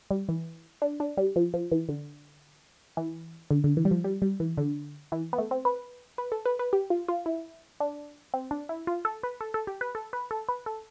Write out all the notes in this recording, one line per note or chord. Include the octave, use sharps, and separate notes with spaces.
G3
E3
D4
D4
G3
F3
F3
E3
D3
E3
D3
D3
E3
G3
F3
G3
G3
E3
D3
E3
B3
A3
C4
B4
B4
A4
B4
B4
G4
F4
F4
E4
D4
C4
D4
E4
F4
A4
B4
A4
A4
G4
B4
A4
B4
A4
B4
A4